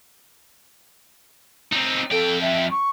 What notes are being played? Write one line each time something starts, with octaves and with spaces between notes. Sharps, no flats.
C4 D#4
F2 A4 G5
E5
C#6